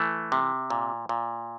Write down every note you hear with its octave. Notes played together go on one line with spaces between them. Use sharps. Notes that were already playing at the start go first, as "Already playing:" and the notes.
Already playing: E3 A3
C3
A#2
A#2